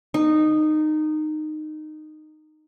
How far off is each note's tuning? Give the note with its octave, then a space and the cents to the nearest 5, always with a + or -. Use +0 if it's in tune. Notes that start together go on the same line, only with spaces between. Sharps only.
D#4 -15